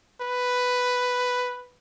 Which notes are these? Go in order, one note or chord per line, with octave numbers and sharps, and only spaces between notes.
B4